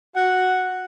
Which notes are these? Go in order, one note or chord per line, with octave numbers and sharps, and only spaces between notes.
F#4 F#5